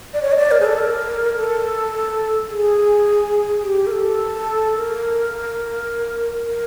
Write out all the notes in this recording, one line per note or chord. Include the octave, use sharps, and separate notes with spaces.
D5
C#5
D#5
D5
A#4
G#4
A4
A#4
A4
G#4
G4
A#4
A4
A#4
A#4